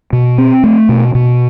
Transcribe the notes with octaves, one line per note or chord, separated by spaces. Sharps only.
B2
C4
A3
B2
B2